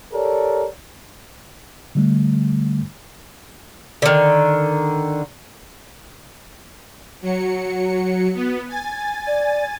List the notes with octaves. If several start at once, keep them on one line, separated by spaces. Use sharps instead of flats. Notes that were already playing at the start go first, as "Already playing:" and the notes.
G4 A4 A#4 C#5 D5
D3 G3 A3
D3 D#3
F#3 F#4 C#7
B3
G#5 A6
D5